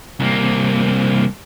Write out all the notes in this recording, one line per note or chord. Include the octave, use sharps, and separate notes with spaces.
C2 A#3